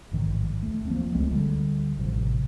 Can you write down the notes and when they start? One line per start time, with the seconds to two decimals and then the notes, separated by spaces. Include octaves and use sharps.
0.12 A1 G#2 D#3 F3
0.63 D#2 A3
0.86 F3 A#3 C4
1.13 C#2 G#3 A3 C4
1.32 D2 D3 G3
1.98 A1 A2 C3 F3